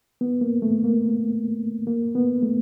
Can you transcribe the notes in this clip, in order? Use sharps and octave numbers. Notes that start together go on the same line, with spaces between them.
B3
A#3
A3
A#3
A#3
B3
A3